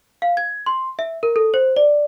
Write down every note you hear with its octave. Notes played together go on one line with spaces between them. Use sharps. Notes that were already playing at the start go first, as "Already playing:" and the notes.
F5
G#6
C6
E5
A#4
A4
C5
D5